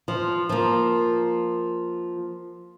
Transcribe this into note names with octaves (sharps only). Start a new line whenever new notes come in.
F3
F3 A#3